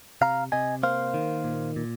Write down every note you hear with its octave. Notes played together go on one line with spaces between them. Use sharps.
C3 F5 A#5
C3 D#5 G#5
A#3 C5 F5
D#3
A#2
A#2